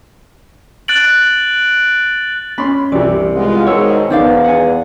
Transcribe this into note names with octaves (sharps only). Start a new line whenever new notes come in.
F#6 A6 D7 F#7
C#4 B5 C6
C2 C3 E3 D5
G#3 B3 F4
G#2 B2 D#3 C#5 E6
E2 D#3 B3 C5 D5 F5
F#5 G#5